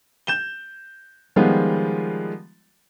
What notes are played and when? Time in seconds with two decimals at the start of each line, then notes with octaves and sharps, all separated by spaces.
0.27 G6 E7 G7
1.36 D#3 F3 G3 G#3 B3 F4